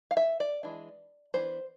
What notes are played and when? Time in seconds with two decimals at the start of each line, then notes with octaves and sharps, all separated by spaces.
0.11 F5
0.17 E5
0.40 D5
0.63 E3 G#3 D4
1.34 E3 B3 D4 C5